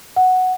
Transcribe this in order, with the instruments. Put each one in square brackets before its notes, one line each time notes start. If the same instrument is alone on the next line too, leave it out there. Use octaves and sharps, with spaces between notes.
[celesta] F#5